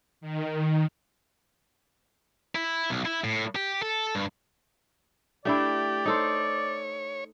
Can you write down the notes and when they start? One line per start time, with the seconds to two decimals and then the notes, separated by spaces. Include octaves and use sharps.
0.21 D#3
2.55 E4
2.90 B1
3.05 E4
3.24 A2
3.55 G4
3.82 A4
4.15 G2
5.45 A3 D4 E4 G4 D5
6.06 D#4 A4 C5 C#5